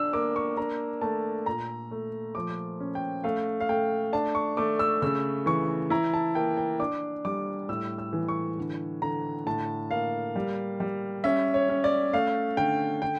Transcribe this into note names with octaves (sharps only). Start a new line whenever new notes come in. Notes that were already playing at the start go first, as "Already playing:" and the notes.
Already playing: D4 E6
A#3 D6
C#6
D4 A#5
A3 A5
A#2 A#5
A3
F3 D6
C#4
G5
A3 F5
F5
A3 G5
D4 A5
C#6
A3 D6
E6
C#3 E6
E3 C#6
E4 A#5
A5
A#3 G5
G5
D4 D6
G3 D6
A2 E6
E6
E3
C#6
D3
D3 A#5
A2 A5
A#3 F5
G3
G3
C#4 E5
C#5
C#4
D5
A3 F5
D3 G5
D3 G5